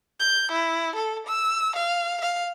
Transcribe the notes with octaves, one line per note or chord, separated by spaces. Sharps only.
G6
E4
A4
E6
F5
F5